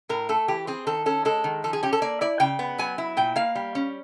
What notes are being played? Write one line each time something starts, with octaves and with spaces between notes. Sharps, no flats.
A2 A#4
A3 A4
E3 G4
C4 G#4
D#3 A4
C#4 A4
G#3 A4
D#3
F3 A4
G#4
C#4 G4
A4
A#3 D5
E4 D5
C#3 G5
B3
F#3 G#5
E4
A#2 G5
A#3 F5
G3
C#4